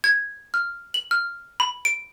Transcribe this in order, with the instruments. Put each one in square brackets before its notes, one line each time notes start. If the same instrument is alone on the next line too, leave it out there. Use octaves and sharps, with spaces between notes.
[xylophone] G#6
F6
F#7
F6
B5
D7